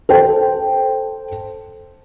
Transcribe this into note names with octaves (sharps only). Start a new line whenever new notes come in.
A4 C5 G5